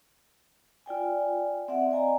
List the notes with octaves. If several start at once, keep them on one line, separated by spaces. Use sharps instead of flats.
F4 D5 G5 G#5
C4 D5 E5 F#5
D5 D#5 G#5 A#5